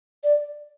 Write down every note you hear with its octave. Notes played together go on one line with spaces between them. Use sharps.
D5